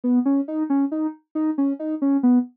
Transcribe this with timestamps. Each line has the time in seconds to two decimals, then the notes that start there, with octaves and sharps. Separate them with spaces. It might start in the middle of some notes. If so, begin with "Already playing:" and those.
0.04 B3
0.25 C#4
0.48 D#4
0.70 C#4
0.92 D#4
1.35 D#4
1.58 C#4
1.79 D#4
2.02 C#4
2.23 B3